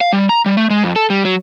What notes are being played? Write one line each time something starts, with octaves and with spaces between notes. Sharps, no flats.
F5
G3
A#5
G3
A3
G#3
F2
A4
G3
F#3